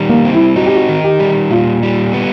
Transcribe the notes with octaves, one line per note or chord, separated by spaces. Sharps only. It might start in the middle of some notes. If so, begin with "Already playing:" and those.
Already playing: D#3 G3
A#3
C4
E4
D#4 F#4
G4
F#4
D#3
G4
G3
A#2 F4
G3
B3